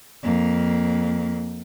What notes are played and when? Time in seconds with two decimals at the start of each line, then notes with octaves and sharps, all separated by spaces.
0.23 F2 A#3